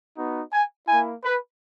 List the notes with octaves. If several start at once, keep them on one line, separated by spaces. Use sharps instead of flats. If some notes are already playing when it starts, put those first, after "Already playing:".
B3 D#4 F#4
G#5
A#3 E4 G#5
B4